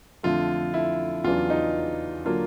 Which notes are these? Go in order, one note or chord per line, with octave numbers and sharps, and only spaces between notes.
F2 D3 F3 A3 F4
E4
E2 C#3 F#3 B3 D4 F4
D#4
D3 F#3 A#3 D4 F4